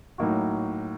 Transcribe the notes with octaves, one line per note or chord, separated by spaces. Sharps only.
A2 F#3 A#3 D#4 F#4